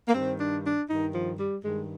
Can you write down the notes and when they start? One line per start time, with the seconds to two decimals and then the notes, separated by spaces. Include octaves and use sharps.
0.08 A#3
0.14 G2 D#3 C4
0.40 D4
0.65 D4
0.89 G2 D#3 D#4
1.14 F3
1.39 G3
1.63 G2 D#3 G#3